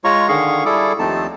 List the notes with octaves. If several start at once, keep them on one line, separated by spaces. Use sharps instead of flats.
G#3 F4 C#5 A#5 C#6
D3 D#3 G#4 F5 C#6
G3 E4 G#4 A4 D6
D#2 F3 A3 C4 D#4 A5